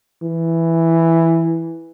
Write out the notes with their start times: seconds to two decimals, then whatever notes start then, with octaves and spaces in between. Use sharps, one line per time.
0.23 E3